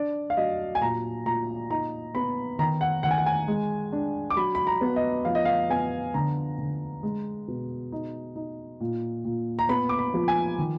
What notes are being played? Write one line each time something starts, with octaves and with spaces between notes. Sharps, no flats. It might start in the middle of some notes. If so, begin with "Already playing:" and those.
Already playing: D4 D5
F5
F#3 D#5
G#5
A#2 A#5
A#2 A#5
D#4 A#5
B3 B5
D#3 A#5
F#5
D#3 F#5
G#5
F#5
G#5
G#3
D4
D6
F#3 B5
B5
A#5
B3
D#5
F3 F5
D#5
F5
B3 G#5
D3 A#5
D3
G#3
B2
D#4
D#4
A#2
A#2
A#5
B3 B5
D6
B5
F3
G#5
D#3